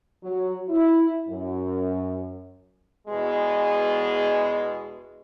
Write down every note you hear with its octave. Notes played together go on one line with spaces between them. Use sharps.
F#3
E4
F#2
E2 B2 G#3